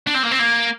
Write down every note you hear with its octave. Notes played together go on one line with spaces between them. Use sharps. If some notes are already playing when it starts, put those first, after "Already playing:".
D4
C4
A#3
C4
A#3